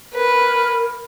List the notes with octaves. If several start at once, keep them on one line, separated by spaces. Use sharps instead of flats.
A#4 B4